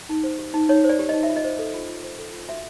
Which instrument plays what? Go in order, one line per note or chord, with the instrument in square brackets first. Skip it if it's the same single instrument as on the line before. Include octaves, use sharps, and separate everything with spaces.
[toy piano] D#4
C5
G4
D#4
D#4 C#5
C5
D5
G4
D#4 D#5
E5
F4
D#5
C5
A4
F4
F4
C5
A4
F4
F#4 E5